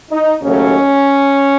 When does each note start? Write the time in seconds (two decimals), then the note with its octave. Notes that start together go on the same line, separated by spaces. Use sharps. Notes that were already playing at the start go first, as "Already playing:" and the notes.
0.11 D#4
0.42 D#2 C#3 F#3 A3 C#4